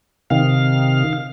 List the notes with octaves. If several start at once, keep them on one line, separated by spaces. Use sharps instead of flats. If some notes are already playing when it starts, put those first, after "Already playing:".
C3 D#3 F5